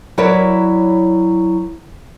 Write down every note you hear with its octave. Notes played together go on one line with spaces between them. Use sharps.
F#3 E4 A#4 B4 C#5 D5